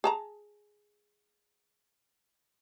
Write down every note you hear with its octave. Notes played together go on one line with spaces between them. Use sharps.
G#4 A5 A#5